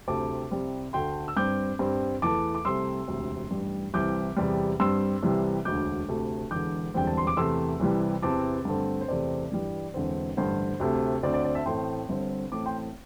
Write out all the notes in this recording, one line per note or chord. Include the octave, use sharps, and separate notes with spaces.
D2 C3 A3 C4 A5 D6
C2 C3 G3 C4
D2 D3 A3 G5 C6
E6
G2 G3 C4 D6 G6
G2 G3 C4
E2 E3 A3 A5 D6
D6
C2 C3 A3 C4 C6 E6
E1 D2 C3
A1 G2 G3
C2 C3 E3 C4 D6 G6
E2 C3 G3
G2 G3 C4 C6 E6
C2 C3 E3 G3
E1 D2 D3 D6 G6
D2 C3 A3
E1 E2 D3 D6 G6
E1 E2 D3 G3 C4 G5
A5
C6
D6
E2 C3 A3 C4 C6 E6
C2 C3 E3 G3
E2 C3 E3 C4 A5 D6
G2 D3 A3 C4
C5
E2 C3 A3 C4 D5
G2 E3 G3
E1 E2 D3 C4
A1 G2 D3 C5
D2 C3 A3 C4
D2 D3 C4 D5
D5
D5
E5 A5
A1 A2 A3 C4 G5 C6
G1 G2 D3 C4
A1 A2 A3 C4 A5 D6
G5 C6